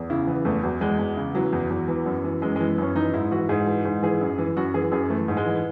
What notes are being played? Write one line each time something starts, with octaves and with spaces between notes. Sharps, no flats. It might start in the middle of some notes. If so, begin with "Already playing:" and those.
Already playing: E2
C#3 E4
E3 B3
E2 A3
E2 F#3
E2 G#3
E2
C#3
E3 F#3
E2
E2
E3
F#2
E3
F#2 G#3
G#3
E3
B3
F#2 C#4
E3 D#4
G#2 E4
E3 F#4
G#2 G#4
E3
G#2
E3 G#4
F#2
E3
F#2 F#4
E3 G#4
F#2 G#4
E3 A3
G#2
G#3
E3